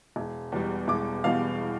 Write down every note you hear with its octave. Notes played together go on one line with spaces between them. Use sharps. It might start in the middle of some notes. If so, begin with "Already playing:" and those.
E1
E2 B2 G3
E1 D6
E2 B2 G3 F5